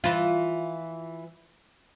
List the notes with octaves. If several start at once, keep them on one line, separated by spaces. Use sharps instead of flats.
E3 F4